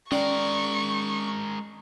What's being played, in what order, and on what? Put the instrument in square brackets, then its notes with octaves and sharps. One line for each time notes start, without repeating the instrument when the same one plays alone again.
[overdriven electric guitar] G#3 A#4 [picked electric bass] C#4 [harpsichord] D5 F#5 G5 [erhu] C#6